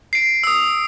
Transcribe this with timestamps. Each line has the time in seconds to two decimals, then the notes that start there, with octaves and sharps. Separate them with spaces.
0.13 C7 D7
0.43 D#6 E6